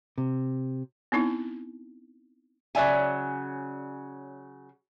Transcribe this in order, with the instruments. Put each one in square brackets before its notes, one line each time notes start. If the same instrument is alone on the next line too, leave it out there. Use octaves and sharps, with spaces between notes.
[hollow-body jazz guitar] C3
[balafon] B3 C4 D#4 E4
[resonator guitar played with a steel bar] C#3 F#3 D5 E5 G#5